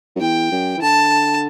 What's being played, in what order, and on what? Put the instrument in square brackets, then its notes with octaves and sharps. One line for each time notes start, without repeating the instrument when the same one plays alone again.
[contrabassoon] F#2
[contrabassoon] E2 [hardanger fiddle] G5
[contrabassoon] F#2
E3
[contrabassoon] D3 [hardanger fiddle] A5